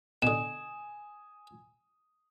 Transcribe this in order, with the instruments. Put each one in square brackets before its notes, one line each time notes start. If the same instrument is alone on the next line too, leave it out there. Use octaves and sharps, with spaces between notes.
[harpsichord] B2 D3 [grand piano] G#5 D#6 [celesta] E7